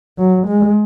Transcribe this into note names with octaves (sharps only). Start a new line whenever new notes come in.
F#3
G#3